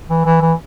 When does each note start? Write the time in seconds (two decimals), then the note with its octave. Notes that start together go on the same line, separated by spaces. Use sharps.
0.10 E3
0.26 E3
0.42 E3